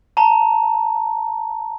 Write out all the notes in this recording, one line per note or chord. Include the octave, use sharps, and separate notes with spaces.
A5 A#5